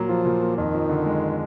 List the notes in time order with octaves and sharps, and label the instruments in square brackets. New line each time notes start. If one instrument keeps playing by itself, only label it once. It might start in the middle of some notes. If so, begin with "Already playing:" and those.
Already playing: [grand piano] A#2 F#3 A#3
[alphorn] F3 [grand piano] F4
[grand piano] A#2
A#3
[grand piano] F2 [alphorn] D#3
[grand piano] F3
D3
G#3